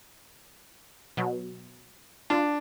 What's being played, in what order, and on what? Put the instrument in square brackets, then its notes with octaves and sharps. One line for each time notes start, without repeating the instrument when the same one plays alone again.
[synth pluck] B2 F#3
[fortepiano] D4 [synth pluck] F4